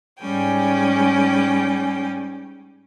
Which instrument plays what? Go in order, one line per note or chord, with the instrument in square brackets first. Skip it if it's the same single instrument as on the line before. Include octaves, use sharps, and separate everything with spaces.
[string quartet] G#2 G3 C#4 G5 G#5